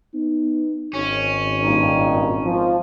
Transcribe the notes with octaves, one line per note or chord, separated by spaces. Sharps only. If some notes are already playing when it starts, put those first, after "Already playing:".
B3 D#4
G#1 C#4
G2 A#2 D#4
F3